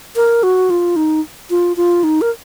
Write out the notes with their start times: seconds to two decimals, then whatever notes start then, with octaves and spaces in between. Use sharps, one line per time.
0.16 A#4
0.43 F#4
0.70 F4
0.96 D#4
1.50 F4
1.77 F4
2.04 D#4
2.21 A#4